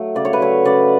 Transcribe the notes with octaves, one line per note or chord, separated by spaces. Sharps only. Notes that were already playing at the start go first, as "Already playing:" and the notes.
Already playing: F#3 A3
C#3 D5
C#5
B4
F#3 A3 C#5
C#3 D5